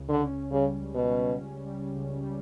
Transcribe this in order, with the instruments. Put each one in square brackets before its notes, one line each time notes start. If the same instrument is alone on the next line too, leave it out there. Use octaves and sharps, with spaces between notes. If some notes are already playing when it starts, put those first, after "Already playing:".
Already playing: [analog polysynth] C#2 C#3
[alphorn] D3
[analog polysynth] C#4
[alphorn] C#3 [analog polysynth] G3
[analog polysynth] C#2
[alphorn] B2
[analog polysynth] C#4
C#2
G3
C#2
G3